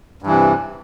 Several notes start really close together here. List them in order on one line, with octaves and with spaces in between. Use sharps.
G2 E3 C3